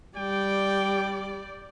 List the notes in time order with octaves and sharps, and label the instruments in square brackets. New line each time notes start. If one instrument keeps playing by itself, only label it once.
[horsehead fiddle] G3 [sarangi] D5 [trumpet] G5